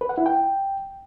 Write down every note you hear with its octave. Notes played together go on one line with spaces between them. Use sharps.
B4
F#5
E4
G5